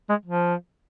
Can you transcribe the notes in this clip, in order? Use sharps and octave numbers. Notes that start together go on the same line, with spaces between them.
G#3
F3